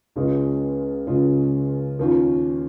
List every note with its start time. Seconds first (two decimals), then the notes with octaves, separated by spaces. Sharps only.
0.16 C#2 C#3 G#3 C#4 F4
1.07 C#2 C#3 G#3 C#4 F4
1.99 D#2 D#3 C#4 F4